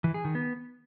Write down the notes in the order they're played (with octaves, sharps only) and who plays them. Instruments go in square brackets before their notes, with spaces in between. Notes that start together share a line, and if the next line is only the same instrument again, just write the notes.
[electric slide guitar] E3
G#4
D#3
B3